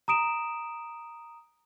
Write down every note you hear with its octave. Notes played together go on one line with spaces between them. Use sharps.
A#5 D#6 D7 E7